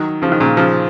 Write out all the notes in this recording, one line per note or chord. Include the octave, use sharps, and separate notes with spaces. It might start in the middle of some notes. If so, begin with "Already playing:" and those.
Already playing: D#3 F#3
C#3 F3
D#3
A#2 C#3
C#3 F3